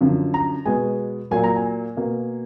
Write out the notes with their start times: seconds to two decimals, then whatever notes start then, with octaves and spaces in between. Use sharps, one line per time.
0.01 F#2 D3 F3
0.34 A#5
0.66 B2 G#3 B3 G#5
1.31 A#2 F#3 A#3 G#5
1.44 A#5
1.56 G#5
1.97 B2 A#3